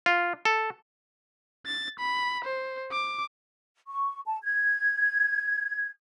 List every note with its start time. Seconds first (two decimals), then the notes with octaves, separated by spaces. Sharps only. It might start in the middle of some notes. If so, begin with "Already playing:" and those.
0.06 F4
0.45 A4
1.66 A6
1.99 B5
2.45 C5
2.91 D6
3.87 C#6
4.26 A5
4.43 G#6